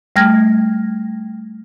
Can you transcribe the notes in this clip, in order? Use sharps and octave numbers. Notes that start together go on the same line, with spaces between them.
G3 A3 G5 F6 G#6 A#6